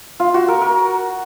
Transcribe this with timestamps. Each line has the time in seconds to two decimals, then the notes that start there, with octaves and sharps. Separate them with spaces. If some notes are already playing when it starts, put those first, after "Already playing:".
0.20 F4
0.34 F#4
0.48 A#4
0.61 A#4